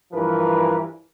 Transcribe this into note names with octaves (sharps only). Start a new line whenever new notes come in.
G2 E3 F3 A#4 B4